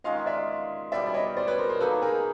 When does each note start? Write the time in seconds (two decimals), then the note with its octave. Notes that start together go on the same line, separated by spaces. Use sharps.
0.04 D#3 G#3 C#4 F4 D#5 F5
0.26 D5 E5
0.92 B2 G3 B3 D5 E5
1.07 D5
1.14 C#5 D#5
1.37 C5 D5
1.47 B4 C#5
1.58 A#4 C5
1.69 A#4 C5
1.80 F#3 A#3 D#4 A4 B4
2.02 G#4 A#4